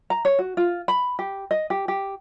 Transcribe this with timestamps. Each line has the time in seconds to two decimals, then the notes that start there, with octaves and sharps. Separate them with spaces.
0.10 A#5
0.25 C#5
0.39 F#4
0.57 F4
0.88 B5
1.19 G4
1.51 D#5
1.70 G4
1.88 G4